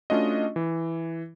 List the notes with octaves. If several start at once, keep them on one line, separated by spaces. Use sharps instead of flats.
A3 C#4 D4 F4 F#4 D#5
E3